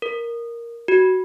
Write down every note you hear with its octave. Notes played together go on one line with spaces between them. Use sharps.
A#4
F#4